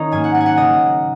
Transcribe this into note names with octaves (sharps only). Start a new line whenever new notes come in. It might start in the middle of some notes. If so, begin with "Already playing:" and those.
Already playing: D#3 C#4 D#4 D#5
G#2 F#3 A#3 G#5
F#5
F#5
G#5
F#5
C#3 A#3 D#5